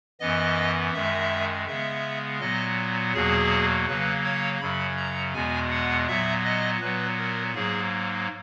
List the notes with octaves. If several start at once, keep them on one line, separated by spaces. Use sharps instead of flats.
F#2 E3 B3 D#5
F#2 D#3 G#3 E5
C#3 G#3 B3 E5
A#2 F#3 B3 D#5
E2 B2 F#3 A#3 G#4
C#3 F#3 A#3 B4
C#5
F#2 C#3 F#3 B5
A#5
E2 B2 G#3 B3 G#5
F#5
A#2 F#3 B3 E5
D#5
A#2 F#3 B3 B4
A#4
G#2 F#3 A#3 G#4